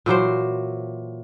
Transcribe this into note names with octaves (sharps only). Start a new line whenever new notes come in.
A#2 E3 F#3 C5